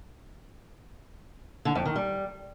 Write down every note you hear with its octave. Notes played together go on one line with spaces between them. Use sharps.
D3
F2
D#3
G3